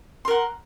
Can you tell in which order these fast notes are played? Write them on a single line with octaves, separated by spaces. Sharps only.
C6 A#4 F#5